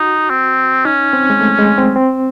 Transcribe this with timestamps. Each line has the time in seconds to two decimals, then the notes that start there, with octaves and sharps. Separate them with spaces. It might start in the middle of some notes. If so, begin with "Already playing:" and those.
Already playing: D#4 F#4
0.30 C4
0.85 C#4 D#4
1.13 C4
1.30 G#3
1.41 A3
1.59 G#3
1.78 C4
1.96 C4